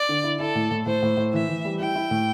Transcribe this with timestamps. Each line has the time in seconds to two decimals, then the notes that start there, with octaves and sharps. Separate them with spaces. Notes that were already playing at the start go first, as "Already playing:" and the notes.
Already playing: D5
0.09 D3
0.24 E4
0.39 E4 A4
0.55 A2
0.71 A2
0.86 A2 C5
1.03 A2
1.17 A2
1.33 E3 E5
1.49 E3
1.65 G3
1.80 E4 G5
1.95 E4
2.11 A2